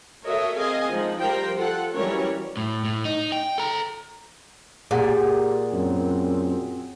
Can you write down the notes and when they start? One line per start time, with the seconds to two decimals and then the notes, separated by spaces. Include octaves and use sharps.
0.25 F#4 A4 A#4 C#5 D#5 E5
0.56 C4 G#4 D#5 F5 G#5
0.90 F3 G#3 D#4
1.20 F3 G3 A#4 C5 G5
1.56 F4 A4 F#5
1.93 E3 F#3 G3 C#4 A#4 C#5
2.57 A2
2.85 A2
3.05 D#4
3.32 G5
3.58 A4 A#5
4.91 A#2 G4 G#4 F#5
5.73 F#2 C4